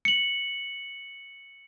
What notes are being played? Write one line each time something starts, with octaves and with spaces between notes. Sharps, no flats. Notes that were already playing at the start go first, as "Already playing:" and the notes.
C#7 F#7